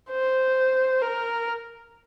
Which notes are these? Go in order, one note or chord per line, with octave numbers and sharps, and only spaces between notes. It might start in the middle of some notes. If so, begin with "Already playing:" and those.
C5
A#4